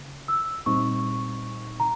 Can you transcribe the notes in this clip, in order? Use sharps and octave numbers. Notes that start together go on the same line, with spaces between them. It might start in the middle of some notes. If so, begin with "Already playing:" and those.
Already playing: C#3
E6
A#2 G3 C4 D#4 C#6
A#5